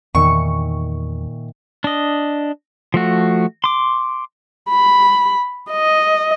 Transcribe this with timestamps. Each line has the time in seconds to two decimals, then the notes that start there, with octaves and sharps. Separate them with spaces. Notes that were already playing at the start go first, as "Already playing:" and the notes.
0.15 E2 A#2 D#3 E5 C#6
1.84 D4 D#5
2.94 F3 A3 F#4
3.64 C6 D6
4.69 B5
5.71 D#5